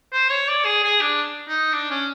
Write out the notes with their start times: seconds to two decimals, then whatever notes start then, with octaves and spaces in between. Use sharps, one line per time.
0.12 C5
0.30 C#5
0.48 D5
0.65 G#4
0.83 G#4
1.01 D4
1.48 D#4
1.73 D4
1.90 C#4